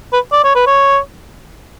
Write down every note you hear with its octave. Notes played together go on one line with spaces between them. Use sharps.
B4
D5
C#5
B4
C#5